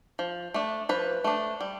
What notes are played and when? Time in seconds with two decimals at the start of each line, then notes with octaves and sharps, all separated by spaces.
0.19 F3
0.54 A3 D4
0.89 F3 B4
1.24 A3 D4
1.61 G3